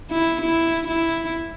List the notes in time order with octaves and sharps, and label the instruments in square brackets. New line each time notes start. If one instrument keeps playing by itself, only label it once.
[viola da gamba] E4
E4
E4